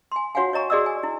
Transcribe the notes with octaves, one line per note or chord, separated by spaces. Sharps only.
G#5 C6
F4 F#4 C#5 F5 F#5 G#5
C#5 D#5 A#5 C#6
F#4 G#4 D5 D#5 D#6 E6
G#5
E4